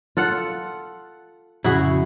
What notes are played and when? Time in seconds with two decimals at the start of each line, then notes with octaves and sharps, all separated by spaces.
0.17 F4 A4 F#5
1.64 F2 C#3 E4 F#4 G#4